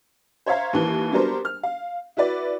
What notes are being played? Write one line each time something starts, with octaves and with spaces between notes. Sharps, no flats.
C5 C#5 E5 F5 A#5
D#2 E3 A#3
F#3 G3 B3 D4 A#4 C5
F6
F5
E4 F#4 B4 D5